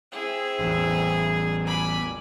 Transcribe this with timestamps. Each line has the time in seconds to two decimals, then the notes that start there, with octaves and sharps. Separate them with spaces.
0.12 C4 E4 G#4
0.59 A1 E2
1.67 G#5 B5 D6